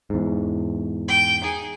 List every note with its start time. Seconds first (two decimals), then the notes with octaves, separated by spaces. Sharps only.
0.10 E2 G#2
1.08 G5
1.41 D#4 G#4